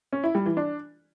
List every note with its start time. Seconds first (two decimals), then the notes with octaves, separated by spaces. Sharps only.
0.13 C#4
0.24 E4
0.35 G3
0.46 E3
0.57 D4